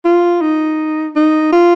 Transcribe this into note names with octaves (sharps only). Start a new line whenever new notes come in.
F4
D#4
D#4
F4